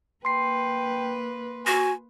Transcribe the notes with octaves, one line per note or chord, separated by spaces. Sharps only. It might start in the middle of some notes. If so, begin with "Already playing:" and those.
A#3 B4 G5 C6 C7
F#4 G#5